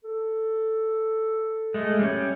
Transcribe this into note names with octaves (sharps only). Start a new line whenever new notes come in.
A4
G#3 A3
G3 C#4